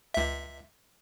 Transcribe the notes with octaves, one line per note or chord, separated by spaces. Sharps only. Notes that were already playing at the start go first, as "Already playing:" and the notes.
C#2 E5